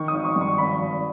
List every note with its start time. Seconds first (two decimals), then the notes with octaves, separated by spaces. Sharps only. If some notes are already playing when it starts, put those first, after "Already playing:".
Already playing: D#3 C#6
0.08 D#6
0.13 G#1
0.24 C#6
0.36 G2
0.41 C#6
0.58 G#1 B5
0.81 G#1